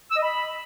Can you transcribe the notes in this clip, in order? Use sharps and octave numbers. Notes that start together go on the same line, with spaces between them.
E6
D#5
B5